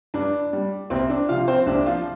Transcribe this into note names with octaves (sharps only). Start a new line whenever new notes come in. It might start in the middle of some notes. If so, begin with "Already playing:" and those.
G2 D4
G3
C2 C4
D4
C3 F3 F4 F5
C4 C5
C2 D4
F3 F4